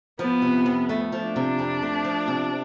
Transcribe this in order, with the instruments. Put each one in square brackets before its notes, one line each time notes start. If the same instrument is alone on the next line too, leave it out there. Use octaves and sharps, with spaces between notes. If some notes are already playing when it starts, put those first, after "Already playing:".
[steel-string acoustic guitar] F3 [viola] B3
[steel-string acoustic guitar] C3
F2
A3
F3
[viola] D4
[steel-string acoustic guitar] C3
F2
A3
F3
C3